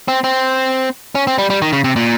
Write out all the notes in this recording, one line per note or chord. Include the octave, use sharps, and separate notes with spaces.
C4
C4
C#4
C4
G3
G3
D#3
C#3
C3
A#2